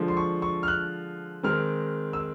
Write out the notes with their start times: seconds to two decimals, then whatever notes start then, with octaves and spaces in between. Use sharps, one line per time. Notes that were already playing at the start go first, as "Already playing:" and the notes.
Already playing: D3 F3 G#3
0.08 C6
0.17 C#6
0.42 C#6
0.63 F6
0.68 F#6
1.43 D#3 G#3 C4 F6
2.13 E6